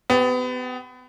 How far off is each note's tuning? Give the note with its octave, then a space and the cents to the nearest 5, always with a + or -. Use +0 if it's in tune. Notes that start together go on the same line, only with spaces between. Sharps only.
B3 +30 G4 +0